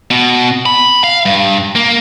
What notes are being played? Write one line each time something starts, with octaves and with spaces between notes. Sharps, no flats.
B2
B5
F5
G2
A#3